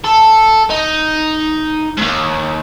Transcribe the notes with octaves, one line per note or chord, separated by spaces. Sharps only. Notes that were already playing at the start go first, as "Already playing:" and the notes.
A4
D#4
D#2 G#2